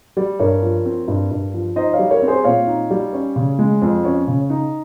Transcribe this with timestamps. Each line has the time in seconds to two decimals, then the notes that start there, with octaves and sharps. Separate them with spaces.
0.17 G3
0.40 G2 A#4 C#5
0.62 F3
0.85 C4
1.08 G2
1.31 G2
1.54 F3
1.76 D#4 C5 D#5
1.93 C#5 F5
1.99 G3
2.11 A#4 C#5
2.22 C4
2.28 G#4 C5
2.44 A#2 C#5 F5
2.67 D#4
2.90 G3
3.13 C#4
3.36 C#3
3.59 G#3
3.82 F2
4.05 C#4
4.27 C#3
4.50 D#4